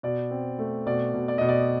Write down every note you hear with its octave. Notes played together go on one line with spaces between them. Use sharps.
B2 D5
C4
A3
B2 D5
B2
D5
B2 D#5
D5